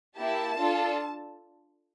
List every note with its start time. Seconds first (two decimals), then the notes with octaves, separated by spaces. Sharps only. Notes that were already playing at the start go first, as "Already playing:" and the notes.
0.16 A#3 E4 G4 A5
0.58 D4 F4 A4